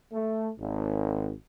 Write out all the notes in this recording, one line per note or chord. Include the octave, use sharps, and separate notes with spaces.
A3
G#1